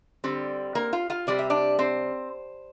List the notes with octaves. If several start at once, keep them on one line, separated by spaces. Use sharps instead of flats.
D3 G3 C4
A#3 A#4
F4 F5
F4 F5
C3 G3 C4 D5
E5
D4 D5
C4 C5